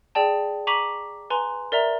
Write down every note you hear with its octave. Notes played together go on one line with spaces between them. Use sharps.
G#4 D5 G5 A5
A#5 C#6 D6 B6 D#7 F#7
B4 G#5 A#5 C6
A#4 D5 E5 A#5